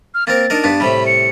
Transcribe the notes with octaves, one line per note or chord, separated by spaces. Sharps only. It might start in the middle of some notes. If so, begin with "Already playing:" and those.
F6
A#3 C4 A#4 A6
D4 D#4 A#4
G2 B3 D4
A2 C3 G3 B5
C#7